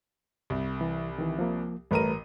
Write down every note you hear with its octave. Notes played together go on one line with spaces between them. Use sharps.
C2
E3
D#3 E3
F3 A#3
A1 G3 A3 A#4 B4 D#7